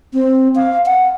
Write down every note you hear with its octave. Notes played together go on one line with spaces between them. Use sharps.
C4
F5
F#5